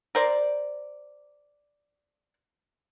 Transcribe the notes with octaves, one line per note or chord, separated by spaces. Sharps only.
A#4 C5 D5